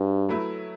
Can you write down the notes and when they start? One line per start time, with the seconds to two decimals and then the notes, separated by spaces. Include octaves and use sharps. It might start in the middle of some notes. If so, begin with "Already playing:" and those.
Already playing: G2 F#4
0.29 F#3 A3 E4 B4